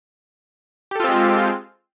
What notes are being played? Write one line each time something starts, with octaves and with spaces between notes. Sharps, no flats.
G#3 C4 F4 G4 A4